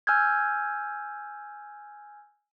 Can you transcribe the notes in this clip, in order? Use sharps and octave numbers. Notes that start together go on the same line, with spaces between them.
G#5 E6 F6 G6 G#6